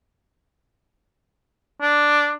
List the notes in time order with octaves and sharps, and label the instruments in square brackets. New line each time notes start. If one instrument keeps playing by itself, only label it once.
[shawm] D4